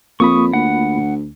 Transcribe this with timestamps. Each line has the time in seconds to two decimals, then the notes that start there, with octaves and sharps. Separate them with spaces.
0.20 F2 A#3 F4 B5 C#6 D#6
0.53 D2 F#5